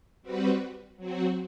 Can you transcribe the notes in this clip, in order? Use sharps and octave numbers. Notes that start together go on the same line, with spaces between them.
G3 C4 F#4 B4
F#3 C4 F#4